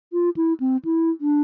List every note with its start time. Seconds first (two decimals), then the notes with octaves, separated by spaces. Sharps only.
0.13 F4
0.37 E4
0.60 C4
0.85 E4
1.21 D4